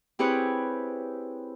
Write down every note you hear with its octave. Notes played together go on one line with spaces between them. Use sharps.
C4 E4 G4 G#4 B4 C#5